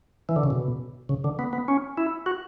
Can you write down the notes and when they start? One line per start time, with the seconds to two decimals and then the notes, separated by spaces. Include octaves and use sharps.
0.29 E3
0.36 D3
0.44 C#3
0.50 B2
1.09 C#3
1.24 D3
1.39 B3
1.53 B3
1.68 C#4
1.98 E4
2.26 F#4